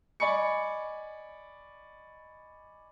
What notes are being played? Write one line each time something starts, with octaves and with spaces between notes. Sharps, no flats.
D5 D#5 G#5 B5 C#6 C#7